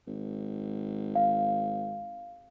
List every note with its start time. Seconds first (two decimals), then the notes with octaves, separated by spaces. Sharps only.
0.07 G#1
1.15 F5